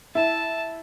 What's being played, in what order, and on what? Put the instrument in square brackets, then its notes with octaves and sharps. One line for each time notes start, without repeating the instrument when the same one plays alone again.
[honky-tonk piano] E4 [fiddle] A5